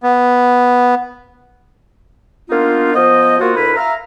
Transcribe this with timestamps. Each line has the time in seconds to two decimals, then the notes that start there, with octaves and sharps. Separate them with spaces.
0.03 B3
2.50 A#3 B3 D4 D#4 F4
2.95 F3 B3 C5 D#5
3.40 A#3 F4 F#4
3.56 D2 E4 A#4 B4 B5
3.76 E5 F5 A#5